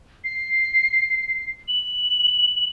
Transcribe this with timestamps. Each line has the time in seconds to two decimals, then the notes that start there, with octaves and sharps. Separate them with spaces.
0.24 C7
1.68 F#7